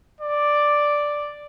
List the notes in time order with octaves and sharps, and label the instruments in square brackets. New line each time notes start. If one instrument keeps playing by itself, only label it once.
[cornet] D5